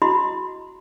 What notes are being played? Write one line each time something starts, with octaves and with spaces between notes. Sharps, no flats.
E4 F#4 D#5 B5 C6